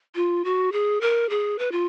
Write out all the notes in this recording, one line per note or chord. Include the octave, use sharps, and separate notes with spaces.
F4
F#4
G#4
A#4
G#4
B4
F4